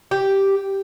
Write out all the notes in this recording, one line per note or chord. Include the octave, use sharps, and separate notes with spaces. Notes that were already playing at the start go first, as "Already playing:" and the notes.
G4